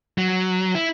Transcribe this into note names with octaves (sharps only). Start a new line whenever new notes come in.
F#3
E4